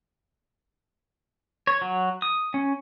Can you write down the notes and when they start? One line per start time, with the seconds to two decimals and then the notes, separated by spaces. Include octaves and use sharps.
1.67 C#5
1.82 F#3
2.22 D#6
2.54 C#4